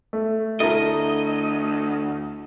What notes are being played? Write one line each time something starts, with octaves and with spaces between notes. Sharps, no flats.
A3
D2 E4 A4 A#4 D#5